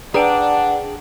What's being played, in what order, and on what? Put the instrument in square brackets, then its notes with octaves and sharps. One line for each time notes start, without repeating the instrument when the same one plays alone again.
[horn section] D4 [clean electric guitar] G#4 G5 A5 [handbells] B4 D5 A#5 [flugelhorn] F#5